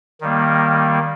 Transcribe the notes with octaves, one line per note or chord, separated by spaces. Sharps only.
D#3 G3 A#3